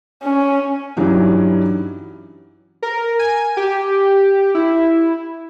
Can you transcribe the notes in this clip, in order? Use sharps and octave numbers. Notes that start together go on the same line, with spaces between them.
C#4
G2 E3 F#3 C#4 D#4
A#4
G#5
G4
E4